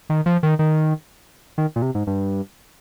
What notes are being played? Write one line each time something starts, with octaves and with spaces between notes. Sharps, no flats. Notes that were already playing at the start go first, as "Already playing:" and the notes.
D#3
F3
D#3
D#3
D#3
A#2
C3
G#2
G2